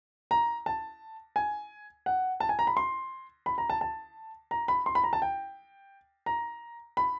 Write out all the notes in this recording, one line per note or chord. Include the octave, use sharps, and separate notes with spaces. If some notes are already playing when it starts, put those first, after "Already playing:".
A#5
A5
G#5
F#5
A5
G#5
A#5
B5
C6
B5
A#5
A5
A5
A#5
B5
C6
B5
A#5
A5
G5
A#5
B5